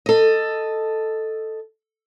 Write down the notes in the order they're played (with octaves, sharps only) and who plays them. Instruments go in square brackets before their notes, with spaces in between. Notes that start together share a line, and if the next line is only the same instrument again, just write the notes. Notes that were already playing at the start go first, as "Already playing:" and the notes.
[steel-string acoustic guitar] A4 D#5